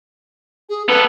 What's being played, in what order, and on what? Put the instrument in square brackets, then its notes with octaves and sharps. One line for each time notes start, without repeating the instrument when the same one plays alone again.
[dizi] G#4
[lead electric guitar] B3 A4 [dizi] B4